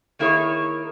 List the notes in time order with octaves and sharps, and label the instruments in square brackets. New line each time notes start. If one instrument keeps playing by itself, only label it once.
[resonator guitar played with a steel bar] D#3 A#3 E4 G#4 A#4 C#5